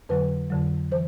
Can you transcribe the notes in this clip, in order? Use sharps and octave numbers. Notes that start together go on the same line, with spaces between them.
F2 D3 F#3 B4
F2 D3 F#3
E3 C5